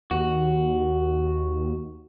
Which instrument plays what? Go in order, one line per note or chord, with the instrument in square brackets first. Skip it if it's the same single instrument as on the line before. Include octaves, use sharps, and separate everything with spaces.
[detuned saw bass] D#2 [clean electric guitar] F#4